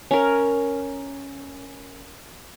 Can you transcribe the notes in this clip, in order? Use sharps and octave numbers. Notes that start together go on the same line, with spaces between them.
C#4 A#4